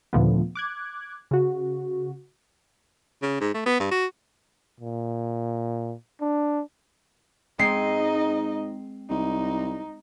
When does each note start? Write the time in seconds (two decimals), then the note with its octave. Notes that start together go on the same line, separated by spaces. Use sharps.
0.13 D#2 A#2 D3 F3 A3 B3
0.55 D6 F#6 G#6
1.31 C#3 F#4
3.22 C#3
3.41 G#2
3.54 A3
3.66 B3
3.79 G2
3.91 F#4
4.80 A#2
6.21 D4
7.59 G#2 G#3 C4 D#4 D#5 C7
9.10 C2 D#4